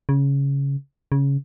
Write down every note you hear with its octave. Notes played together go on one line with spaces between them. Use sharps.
C#3
C#3